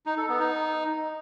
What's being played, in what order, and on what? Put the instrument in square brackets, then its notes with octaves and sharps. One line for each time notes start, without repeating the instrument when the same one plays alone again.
[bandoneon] D#4
A4
B3
D#4